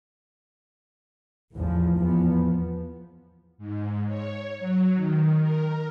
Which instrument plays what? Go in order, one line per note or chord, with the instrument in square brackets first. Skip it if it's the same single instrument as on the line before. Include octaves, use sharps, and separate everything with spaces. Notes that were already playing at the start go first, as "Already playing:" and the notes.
[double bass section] A1 E2 F3
E2 F3 B3
[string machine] G#2
C#5
F#3
D#3
A#4